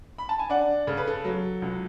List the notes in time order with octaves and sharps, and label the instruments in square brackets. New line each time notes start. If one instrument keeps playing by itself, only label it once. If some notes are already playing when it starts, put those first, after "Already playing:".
[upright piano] B5
A5
G#5
D4 D5 F#5
C#3 A4
B4
A4
F#3
C#2